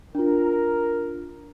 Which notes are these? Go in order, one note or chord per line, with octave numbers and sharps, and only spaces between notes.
D4 F4 A#4